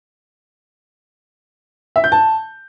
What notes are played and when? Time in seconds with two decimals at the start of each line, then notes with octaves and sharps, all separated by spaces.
1.96 E5
2.04 G6
2.12 A5